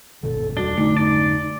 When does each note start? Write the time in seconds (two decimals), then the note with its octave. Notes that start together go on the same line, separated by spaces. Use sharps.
0.23 G1 B2 D#3 A4
0.57 E1 G3 D4 F#4 G7
0.77 F1 D3 A3 D#4
0.97 D#4 D5